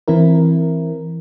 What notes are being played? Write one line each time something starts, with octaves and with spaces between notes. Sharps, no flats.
E3 C4 E4 A#4